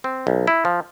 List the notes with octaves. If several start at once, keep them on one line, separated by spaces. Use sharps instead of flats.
C4
B1
E4
F3